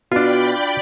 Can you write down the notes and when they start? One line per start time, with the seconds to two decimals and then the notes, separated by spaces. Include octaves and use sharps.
0.12 B2 D4 F4 F#4 D5 G5 B5